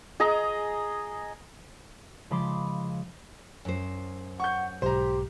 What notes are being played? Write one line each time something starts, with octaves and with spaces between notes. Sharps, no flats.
G#4 D#5 A#5
C#3 F3 G#3 B5 C6 D6
F#2 C5
F#5 C#6 G6
B1 G#2 F#3 G4 C5 A#5